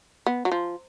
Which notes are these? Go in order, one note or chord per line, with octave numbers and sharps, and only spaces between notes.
B3
F#3
F3